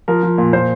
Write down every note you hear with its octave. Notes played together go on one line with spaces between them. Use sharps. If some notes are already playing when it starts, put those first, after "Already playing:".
F3 A#4
F3
A#2
A#2 C5